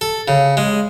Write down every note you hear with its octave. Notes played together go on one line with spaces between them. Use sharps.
A4
C#3
G#3